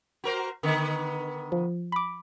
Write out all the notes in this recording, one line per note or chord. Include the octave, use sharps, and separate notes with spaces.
F#4 A#4 C5
D3 D#3 B3
F3
B5 D6